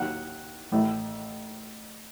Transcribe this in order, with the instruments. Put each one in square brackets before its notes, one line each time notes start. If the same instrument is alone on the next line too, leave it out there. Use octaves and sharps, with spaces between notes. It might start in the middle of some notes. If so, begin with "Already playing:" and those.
Already playing: [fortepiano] D#2 D#3 F#3 F#5
A1 A2 A3